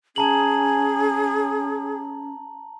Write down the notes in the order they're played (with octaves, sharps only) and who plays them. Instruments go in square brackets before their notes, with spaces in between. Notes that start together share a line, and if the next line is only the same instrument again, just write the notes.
[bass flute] C#4 [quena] G#4 [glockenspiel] A5 A#5 F#7